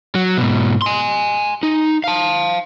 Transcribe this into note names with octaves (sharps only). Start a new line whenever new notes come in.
F#3
G#2 B2
G#5 C6
D#4
F5 A5